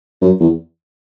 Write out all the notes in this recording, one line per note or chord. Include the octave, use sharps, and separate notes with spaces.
F#2
E2